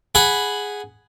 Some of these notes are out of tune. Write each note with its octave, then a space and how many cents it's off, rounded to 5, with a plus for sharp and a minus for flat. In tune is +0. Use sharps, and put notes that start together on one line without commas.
G#4 +0 F#5 +0 B5 +0